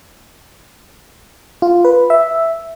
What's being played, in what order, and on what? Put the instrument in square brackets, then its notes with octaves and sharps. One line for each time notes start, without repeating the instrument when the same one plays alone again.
[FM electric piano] F4
B4
E5